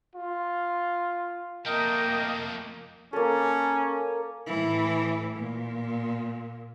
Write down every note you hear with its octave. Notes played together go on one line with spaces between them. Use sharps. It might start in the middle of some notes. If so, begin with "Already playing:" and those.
F4
F2 A3 A#3 A#4 D#5 G5
A#3 C#4 A4
A2 E3
A#2